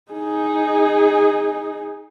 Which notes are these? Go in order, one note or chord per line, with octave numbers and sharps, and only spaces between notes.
D#4 G#4